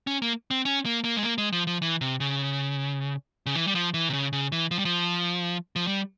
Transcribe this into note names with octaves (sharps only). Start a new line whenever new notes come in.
C#4
A#3
C4
C#4
A#3
A#3
G#3
A#3
G#3
F3
F3
E3
C3
C#3
C#3
E3
G3
F3
E3
C3
C#3
C#3
E3
F3
G3
F3
F3
G3